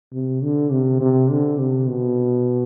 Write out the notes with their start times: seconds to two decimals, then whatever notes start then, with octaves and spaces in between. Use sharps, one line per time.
0.13 C3
0.43 D3
0.72 C3
1.00 C3
1.30 D3
1.59 C3
1.88 B2